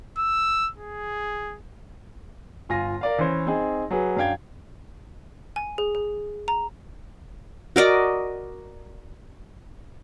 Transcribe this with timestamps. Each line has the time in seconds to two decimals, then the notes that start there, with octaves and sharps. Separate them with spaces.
0.18 E6
0.78 G#4
2.69 G1 F4 G#5 A#6
3.01 A#4 D5 F5
3.18 E3 C#4 C5 C#5
3.47 C4 D#4 G#4
3.91 F#3 G#4 B4
4.17 F#2 D4 F5 G5 G#6
5.56 G#5
5.78 G#4
5.95 G#4
6.48 A#5
7.76 F#4 A#4 D5 D#5